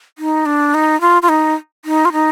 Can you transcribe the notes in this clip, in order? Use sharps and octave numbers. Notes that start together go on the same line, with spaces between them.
D#4
D4
D#4
F4
F4
D#4
D#4
F4
D#4